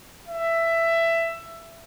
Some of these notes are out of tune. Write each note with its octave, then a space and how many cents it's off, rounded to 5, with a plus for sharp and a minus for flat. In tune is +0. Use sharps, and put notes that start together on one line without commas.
E5 +15